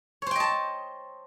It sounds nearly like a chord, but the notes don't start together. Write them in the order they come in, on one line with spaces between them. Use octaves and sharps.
C#5 C5 G5 D#5 A5